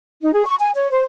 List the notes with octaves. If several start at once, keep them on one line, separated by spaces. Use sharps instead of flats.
D#4
G#4
C#6
G#5
C#5
C5